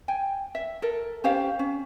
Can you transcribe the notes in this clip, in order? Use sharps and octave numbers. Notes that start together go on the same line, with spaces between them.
G5 G#5
E5
A4 A#4
C#4 G4 C5 F5
C#4